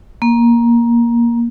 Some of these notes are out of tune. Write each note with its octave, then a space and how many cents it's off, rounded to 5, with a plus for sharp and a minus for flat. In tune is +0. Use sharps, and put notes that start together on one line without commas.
A#3 +15